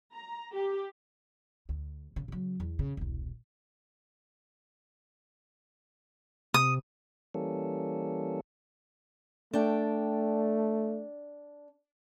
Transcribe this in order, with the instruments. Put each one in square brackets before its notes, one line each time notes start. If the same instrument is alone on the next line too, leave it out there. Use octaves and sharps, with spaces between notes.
[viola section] A#5
G4
[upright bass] D2
C#3
C#3 F#3
E2
C#3
E1 C2
[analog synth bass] C3 [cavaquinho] D#6
[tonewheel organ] E3 G3 A#3 C#4 A4
[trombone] A3 [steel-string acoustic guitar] D4 G5